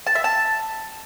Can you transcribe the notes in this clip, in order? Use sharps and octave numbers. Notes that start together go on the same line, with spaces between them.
A5
E5
A5